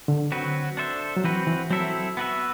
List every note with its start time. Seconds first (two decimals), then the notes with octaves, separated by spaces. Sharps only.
0.08 D3
0.32 F#3 C4 F#4 B4
0.77 D4 A4 C5 E5
1.17 F#3
1.24 E3 C4 F#4 B4
1.47 E3
1.70 F#3 C4 E4 A4 E5
2.17 B3 F#4 B4 E5